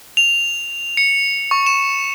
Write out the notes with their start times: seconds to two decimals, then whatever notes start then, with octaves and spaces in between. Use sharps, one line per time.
0.17 F7
0.97 C#7
1.51 C#6
1.66 E7